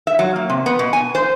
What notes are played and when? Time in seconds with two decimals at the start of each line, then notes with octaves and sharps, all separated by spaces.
0.07 E5
0.19 F#3
0.36 A#3
0.50 C3
0.66 B3
0.79 B2
0.93 G#5
1.15 C5